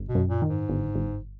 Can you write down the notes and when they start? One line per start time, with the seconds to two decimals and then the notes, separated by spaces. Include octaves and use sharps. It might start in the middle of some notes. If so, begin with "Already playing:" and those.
Already playing: G1
0.09 B2
0.15 F#2
0.28 A#2
0.42 D#3
0.49 G#2
0.69 G1
0.95 G1